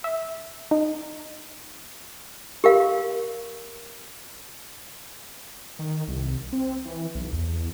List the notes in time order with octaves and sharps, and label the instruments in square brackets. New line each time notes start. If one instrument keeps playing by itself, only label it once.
[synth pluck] E5
D#4
[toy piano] G4 A#4 F5
[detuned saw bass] D#3
C2
C4
E3
B1
E2